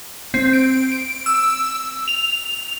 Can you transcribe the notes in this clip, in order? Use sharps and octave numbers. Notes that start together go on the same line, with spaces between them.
C4
D7
D7
E6
F7